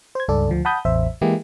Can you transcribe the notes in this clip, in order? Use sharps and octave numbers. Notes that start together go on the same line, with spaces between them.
C5 G#6
C#2 G2 A4 D5
D2 F3
F#5 A5 B5 D#6 G6
A1 E2 C5 E5
E3 G#3 A#3 E4 G4 G#4